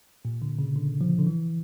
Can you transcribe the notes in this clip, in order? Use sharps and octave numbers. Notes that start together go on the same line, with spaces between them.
A#2
D3
C#3
D3
F3
D3
E3